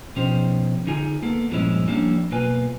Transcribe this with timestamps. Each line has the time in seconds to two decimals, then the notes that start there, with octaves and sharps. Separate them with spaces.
0.16 B2 F3 C#4 D#4 G4 C5
0.87 D3 D#4 F4 G#4 G#5
1.23 A#3 B3 A4
1.51 G2 A#2 F3 G#3 C#4 E4
1.87 F3 G3 A#3 C#4 D4 E4
2.31 B1 A#3 F4 B4 G#5